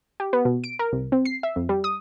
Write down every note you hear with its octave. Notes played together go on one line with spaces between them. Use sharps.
G4
B3
B2
D7
A#4
C2
C4
C7
E5
F2
G3
D#6